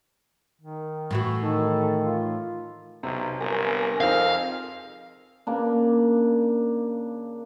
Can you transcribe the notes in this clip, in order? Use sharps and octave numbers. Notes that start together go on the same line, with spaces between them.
D#3
A2 E3 F#4
D#3 A4
F4
B1 C3
G1 A#4 G#5 A#6
F2 C4 D#4 G#4 F5
C#3 A#3 D4